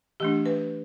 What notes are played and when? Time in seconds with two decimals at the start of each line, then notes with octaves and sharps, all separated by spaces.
0.20 E3 A3 D4 G4
0.46 B4